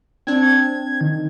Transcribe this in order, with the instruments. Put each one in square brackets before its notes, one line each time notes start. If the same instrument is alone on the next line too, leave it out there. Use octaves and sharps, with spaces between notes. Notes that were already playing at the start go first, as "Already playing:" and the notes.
[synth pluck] C4 D4 [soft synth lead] G#6
[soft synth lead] D#3